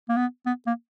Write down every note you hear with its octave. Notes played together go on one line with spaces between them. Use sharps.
A#3
B3
B3
A#3